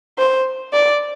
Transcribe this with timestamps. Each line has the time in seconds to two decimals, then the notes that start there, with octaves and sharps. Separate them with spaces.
0.18 C5
0.73 D5